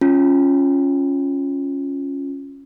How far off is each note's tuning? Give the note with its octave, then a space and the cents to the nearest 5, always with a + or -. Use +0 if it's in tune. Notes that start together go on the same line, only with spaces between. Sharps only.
C#4 +0 F4 +0